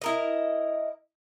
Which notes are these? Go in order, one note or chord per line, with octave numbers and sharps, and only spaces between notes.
E4 A#4 D#5